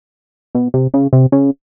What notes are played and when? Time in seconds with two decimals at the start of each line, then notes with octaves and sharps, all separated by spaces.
0.55 B2
0.74 C3
0.94 C#3
1.13 C3
1.32 C#3